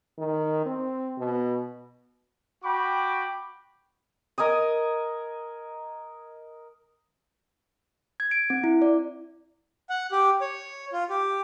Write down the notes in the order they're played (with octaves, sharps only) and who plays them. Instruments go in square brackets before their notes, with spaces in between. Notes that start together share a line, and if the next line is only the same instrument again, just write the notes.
[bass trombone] D#3
C4
B2
[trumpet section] F#4 G5 B5 D6
[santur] A#4 D#5 G#5 D#6
[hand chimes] G#6
D7
C4
E4
D5
[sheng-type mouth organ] F#5
G4
C#5
F4
G4